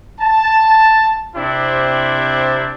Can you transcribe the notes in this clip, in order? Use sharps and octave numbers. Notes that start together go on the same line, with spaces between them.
A5
C3 C4 D4 E4 G4